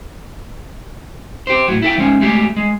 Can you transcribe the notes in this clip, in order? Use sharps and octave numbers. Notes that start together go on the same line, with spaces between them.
G4 C5
A2 F#3
E4 A4 G5
F3 G#3 C#4
G#3 A3 G4
G#3